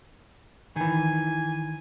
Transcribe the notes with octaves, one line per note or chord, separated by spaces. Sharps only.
D#3 E3 G#5